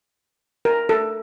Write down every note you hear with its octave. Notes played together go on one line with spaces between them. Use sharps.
A#4
A4